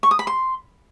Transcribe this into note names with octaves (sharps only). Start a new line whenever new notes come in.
C#6
D#6
B5
C6